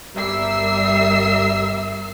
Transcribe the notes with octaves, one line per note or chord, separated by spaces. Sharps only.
G1 G3 A#4 E5 E6 C7